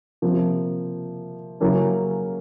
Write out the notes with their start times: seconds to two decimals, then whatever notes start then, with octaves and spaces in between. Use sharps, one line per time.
0.22 C3 F3 A#3
1.60 C#3 F#3 A#3 C#4 E4